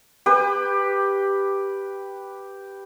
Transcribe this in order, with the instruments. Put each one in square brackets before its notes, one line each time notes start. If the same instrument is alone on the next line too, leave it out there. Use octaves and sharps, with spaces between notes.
[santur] G4 B4